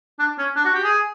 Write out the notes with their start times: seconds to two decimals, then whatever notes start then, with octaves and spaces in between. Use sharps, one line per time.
0.19 D4
0.38 C#4
0.56 D4
0.65 F#4
0.75 G4
0.84 G#4